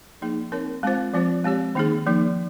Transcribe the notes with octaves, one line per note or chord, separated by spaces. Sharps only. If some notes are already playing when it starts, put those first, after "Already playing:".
F3 A#3 D#4 G#4
C4 D#4 A#4 C#5
G#3 C4 F4 C5
F3 C4 F4 C5
G#3 C4 G4 C#5
D#3 A#3 D#4 G#4 C5
F3 A#3 D#4